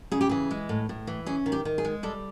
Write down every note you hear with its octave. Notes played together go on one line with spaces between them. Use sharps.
C#3 G#4
G4
E3 G#4
G#3
A2
A2
E3
C#4 G#4
D#3
G4
D#3
G#4
G#3
G3 A4